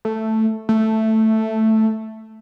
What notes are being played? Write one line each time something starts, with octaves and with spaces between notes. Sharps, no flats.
A3
A3